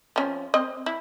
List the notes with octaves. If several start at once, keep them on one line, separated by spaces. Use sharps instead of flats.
F3 C#4
C4 D#5
E4